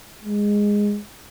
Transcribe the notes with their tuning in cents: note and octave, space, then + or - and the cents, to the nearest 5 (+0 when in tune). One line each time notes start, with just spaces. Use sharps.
G#3 -10